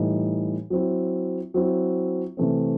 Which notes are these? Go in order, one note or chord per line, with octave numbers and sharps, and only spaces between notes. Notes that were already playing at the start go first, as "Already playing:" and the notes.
Already playing: A2 E3 G3 D#4
F#3 C4 E4
F#3 C4 E4
C3 E3 A3 C4